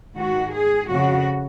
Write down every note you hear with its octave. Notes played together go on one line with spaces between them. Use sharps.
G#2 D#3 F#4
G#4
F2 C#3 F#4